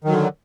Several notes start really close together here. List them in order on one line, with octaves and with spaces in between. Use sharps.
D#3 F#3 D3